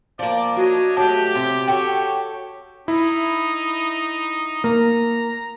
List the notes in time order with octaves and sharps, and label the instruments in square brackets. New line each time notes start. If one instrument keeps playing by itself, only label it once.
[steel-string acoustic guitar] F3 A#3 [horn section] D5
[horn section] D4 C#5 D#5 [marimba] F#4
[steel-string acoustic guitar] F#3 A3 [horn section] G4 [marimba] A5
[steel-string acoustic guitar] C3
[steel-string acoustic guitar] F#4 A4 C#5 [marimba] G5
[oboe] D#4 [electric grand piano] E4
[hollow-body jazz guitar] A#3 [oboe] A#5